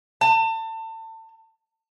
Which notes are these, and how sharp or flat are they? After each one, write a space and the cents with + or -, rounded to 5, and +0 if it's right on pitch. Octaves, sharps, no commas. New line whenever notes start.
A5 +30